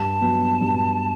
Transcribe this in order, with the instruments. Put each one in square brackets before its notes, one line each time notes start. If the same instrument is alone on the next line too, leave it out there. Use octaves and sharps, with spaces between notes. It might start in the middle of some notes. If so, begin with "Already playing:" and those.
Already playing: [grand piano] G2 [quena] A5
[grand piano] F#3 B3
G2